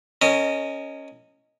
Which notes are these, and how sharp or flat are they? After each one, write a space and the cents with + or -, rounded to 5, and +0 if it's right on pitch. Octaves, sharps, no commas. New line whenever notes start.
C#4 +0 A#4 -35 D#5 +0